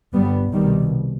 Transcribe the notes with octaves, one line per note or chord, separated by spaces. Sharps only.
G1 G2 G3 B3
C2 B2 D#3 G3